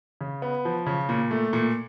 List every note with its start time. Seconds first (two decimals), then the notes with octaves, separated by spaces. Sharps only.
0.21 C#3
0.42 B3
0.65 F3
0.86 C#3
1.09 A#2
1.31 A3
1.53 A#2